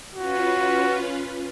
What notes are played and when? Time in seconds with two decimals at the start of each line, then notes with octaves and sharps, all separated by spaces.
0.15 C#4 F4 F#4 B4